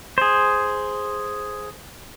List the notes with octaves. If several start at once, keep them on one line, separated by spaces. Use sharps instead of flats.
G#4 C5